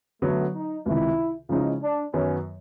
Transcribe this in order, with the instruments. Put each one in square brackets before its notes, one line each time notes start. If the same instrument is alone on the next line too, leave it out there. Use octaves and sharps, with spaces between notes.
[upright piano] D3 F#3 B3 [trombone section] A3
[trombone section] D#4
[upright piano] C#2 C3 D#3 [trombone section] E4
[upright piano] C#3 F3 G#3 C#4 E4 [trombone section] D#4
[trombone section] D4
[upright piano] F#2 D#3 F#3 B3 [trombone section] C#4